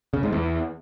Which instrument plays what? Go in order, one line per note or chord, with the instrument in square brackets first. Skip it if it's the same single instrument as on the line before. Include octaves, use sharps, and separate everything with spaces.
[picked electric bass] C#3
G#2
E2